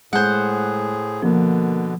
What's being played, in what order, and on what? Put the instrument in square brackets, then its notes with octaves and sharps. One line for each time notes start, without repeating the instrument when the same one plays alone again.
[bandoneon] A2 G#4 [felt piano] G#3 [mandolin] C5 F#5
[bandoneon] B2 D3 [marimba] F3 [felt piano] A#3